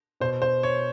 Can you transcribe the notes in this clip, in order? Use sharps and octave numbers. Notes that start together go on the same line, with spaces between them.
B2 C5
C5
C#5